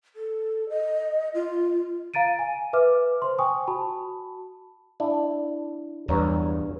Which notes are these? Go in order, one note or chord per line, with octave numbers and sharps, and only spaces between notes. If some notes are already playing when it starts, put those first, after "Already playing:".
A4
D#5
F4
F5 A#5 A6 D7 D#7
G#5
B4 E5 D6 F6
C5 C6
G5 G#5 C#6 D#6
F#4 A5 B5
D4 E4
E2 G2 C#5 A#5